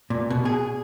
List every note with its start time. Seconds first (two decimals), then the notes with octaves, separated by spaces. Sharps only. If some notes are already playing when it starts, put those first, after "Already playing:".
0.10 A#2
0.30 B2
0.45 G#4